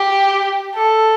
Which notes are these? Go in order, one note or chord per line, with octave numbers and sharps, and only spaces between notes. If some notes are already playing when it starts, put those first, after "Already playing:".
Already playing: G4
A4